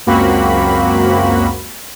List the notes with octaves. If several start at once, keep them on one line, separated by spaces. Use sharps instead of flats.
C#2 F#2 A#3 C4 F#4 B5